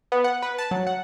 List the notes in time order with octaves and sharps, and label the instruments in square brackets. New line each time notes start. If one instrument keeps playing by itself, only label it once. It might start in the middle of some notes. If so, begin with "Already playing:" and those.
[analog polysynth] B3
F#5
B4
A5
F#3
F#5